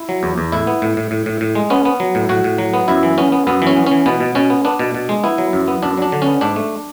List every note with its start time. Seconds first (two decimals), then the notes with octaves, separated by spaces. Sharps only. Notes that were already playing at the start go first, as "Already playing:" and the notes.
Already playing: E4
0.09 F#3
0.23 E2
0.38 E2
0.52 A2 E4
0.67 B3
0.82 A2
0.97 A2
1.11 A2
1.26 A2
1.41 A2
1.55 G#3
1.70 B3 C#4
1.85 B3
2.00 F#3
2.15 A2
2.29 A2 F#4
2.44 A2
2.58 F#3
2.74 B3
2.88 F#2 E4
3.03 E3
3.18 B3 C#4
3.32 B3
3.47 F#2 B3
3.62 E3 C#4
3.77 B3
3.87 E3 C#4
4.06 B2 B3
4.20 B2
4.35 B2 C#4
4.50 B3
4.65 B3 D4
4.79 B2
4.94 B2
5.09 G#3
5.24 B3 E4
5.38 F#3
5.53 F#2
5.68 B3
5.82 F#2 D4
5.97 F#3 D4
6.12 D3
6.22 B3 C#4
6.41 G#2 D4
6.56 A3